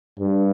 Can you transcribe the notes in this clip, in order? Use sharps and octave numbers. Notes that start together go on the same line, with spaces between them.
G2